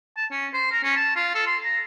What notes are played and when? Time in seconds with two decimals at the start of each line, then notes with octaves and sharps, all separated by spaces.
0.17 A5
0.31 C#4
0.53 C5
0.71 A#4
0.83 C#4
0.96 A5
1.16 F4
1.35 A4
1.46 C6
1.64 A#5